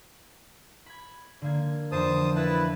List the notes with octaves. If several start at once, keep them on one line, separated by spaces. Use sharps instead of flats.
B5 G#6
D3 A#3 G#6
F2 E3 D4 C5 A5 D#6
E4 B4 A5